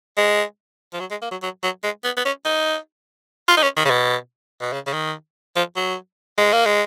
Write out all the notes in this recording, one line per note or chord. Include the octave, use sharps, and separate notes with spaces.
G#3
F3
F#3
G#3
A#3
F#3
F#3
F#3
G#3
B3
B3
C#4
D#4
F4
D#4
C#4
D#3
C#3
B2
B2
C#3
C#3
D#3
F3
F#3
G#3
A#3
G#3